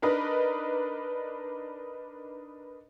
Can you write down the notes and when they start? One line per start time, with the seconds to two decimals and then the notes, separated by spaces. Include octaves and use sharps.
0.02 D4 D#4 A#4 B4 D#5